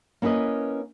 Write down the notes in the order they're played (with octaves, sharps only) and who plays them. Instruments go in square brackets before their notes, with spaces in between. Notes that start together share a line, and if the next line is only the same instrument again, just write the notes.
[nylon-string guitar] A#3 C#4 E4 B4 D#5